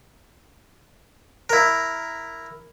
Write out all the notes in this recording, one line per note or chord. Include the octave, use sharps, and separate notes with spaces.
E4 A#4